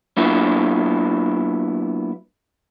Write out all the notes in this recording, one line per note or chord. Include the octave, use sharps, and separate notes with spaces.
F#3 A#3 B3 D4 E4 F4